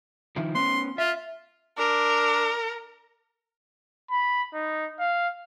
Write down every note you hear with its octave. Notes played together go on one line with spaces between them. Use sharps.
D#3 F3 E4
B3 C#4 C6
F4 E5
D4 A#4
B5
D#4
F5